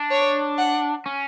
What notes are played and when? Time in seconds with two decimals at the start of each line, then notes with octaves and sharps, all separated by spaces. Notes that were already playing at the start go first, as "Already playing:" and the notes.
Already playing: D4
0.11 C#5
0.58 F#5
1.06 C#4